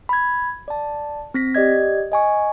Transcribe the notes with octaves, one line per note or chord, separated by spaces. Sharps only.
B5 G#6
D5 A5
C4 A#6 B6
G4 D5 D#5 G#6
D#5 G#5 C#6